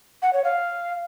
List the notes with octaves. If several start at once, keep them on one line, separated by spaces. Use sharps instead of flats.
F#5
C#5
F5